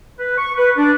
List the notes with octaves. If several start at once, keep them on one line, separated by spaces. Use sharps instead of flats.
B4
C#6
B4
D4